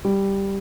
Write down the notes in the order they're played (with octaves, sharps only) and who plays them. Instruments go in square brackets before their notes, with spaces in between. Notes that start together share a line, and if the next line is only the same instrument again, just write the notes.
[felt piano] G3